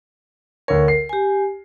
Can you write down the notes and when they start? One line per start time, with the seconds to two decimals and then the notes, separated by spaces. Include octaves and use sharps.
0.68 D2 A#4 C#5
0.88 C7
1.09 G4 G#5